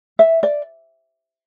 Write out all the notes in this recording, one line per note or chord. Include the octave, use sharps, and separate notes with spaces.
E5
D5